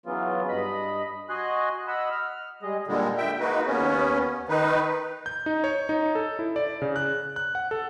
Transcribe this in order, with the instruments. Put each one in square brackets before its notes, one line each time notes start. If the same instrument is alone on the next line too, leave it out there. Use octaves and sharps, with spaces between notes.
[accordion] C#3 E3 F#3 B3 F4
G2 D#5 B5
F#4 D#5 G#5 C6 F#6
D#5 F#5 B5 E6
F6
G3 G#3 G#4 D#5
A#2 D3 G3 G#3
E5 G5
G#3 A#3 D#4 F#4 B4
D#2 B3 C#4
D#3 D#4 B4
[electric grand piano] G6
D#4
C#5
D#4
A4
E4
D5
C#3
F#6
F#6
F#5
A4